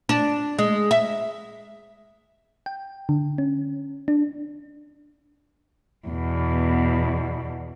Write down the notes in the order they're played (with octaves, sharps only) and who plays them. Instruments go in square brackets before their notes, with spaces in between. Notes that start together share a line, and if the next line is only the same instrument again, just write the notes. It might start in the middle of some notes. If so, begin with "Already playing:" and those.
[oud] D4
G#3
E5
[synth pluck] G5
D3
C#4
D4
[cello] E2 B2